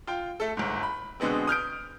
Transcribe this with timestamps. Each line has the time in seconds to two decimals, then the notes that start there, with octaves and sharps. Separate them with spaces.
0.07 F4 G5
0.40 A3 A4
0.57 G1 G#2
0.83 B5
1.20 B2 D3 G#3 B3 C4
1.47 D#6 F6 G6 D7